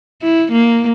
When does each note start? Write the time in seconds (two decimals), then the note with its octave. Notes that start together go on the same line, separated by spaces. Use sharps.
0.22 E4
0.52 A#3